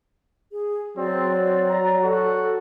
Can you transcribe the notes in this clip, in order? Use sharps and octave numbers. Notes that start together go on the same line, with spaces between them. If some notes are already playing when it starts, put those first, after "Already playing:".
G#4
F#3 C4 D5
C4
A#5
F#4 A4